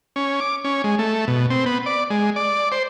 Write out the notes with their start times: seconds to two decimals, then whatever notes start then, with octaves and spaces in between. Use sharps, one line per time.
0.16 C#4
0.40 D6
0.64 C#4
0.84 G#3
0.99 A3
1.28 B2
1.50 C4
1.66 B3
1.86 D5
2.10 G#3
2.36 D5
2.72 C5